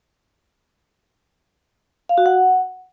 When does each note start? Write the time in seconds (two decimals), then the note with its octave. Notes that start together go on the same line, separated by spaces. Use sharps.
2.09 F5
2.18 F#4
2.26 F#5